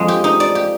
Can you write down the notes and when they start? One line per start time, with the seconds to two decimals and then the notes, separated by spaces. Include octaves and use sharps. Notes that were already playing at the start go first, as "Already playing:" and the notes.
Already playing: F2 G#3
0.08 G4
0.24 D#4
0.40 D5
0.55 G4